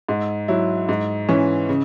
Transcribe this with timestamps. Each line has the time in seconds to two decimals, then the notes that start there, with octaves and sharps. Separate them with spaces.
0.09 G#2
0.48 F#3 E4
0.89 G#2
1.29 E3 C#4
1.69 C#3